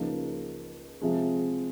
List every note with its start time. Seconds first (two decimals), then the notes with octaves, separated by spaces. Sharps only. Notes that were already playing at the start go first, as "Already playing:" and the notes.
Already playing: C#2 C#3 F3 A#3 D#4
1.01 C3 F3 G#3